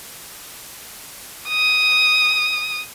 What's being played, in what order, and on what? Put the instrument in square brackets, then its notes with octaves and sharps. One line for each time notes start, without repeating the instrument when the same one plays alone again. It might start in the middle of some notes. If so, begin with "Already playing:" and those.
[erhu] D#6